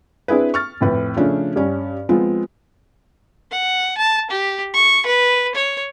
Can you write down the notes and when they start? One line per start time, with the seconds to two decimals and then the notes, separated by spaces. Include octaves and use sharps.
0.28 C4 D4 E4 G#4 B4
0.54 C#6 F6 A6
0.81 F2 A2 B4
1.16 C#3 F3 A3 C#4 D4 A4
1.56 G2 C#4
2.09 F3 G#3 B3 C4 F4
3.51 F#5
3.98 A5
4.31 G4
4.74 C#6
5.06 B4
5.55 C#5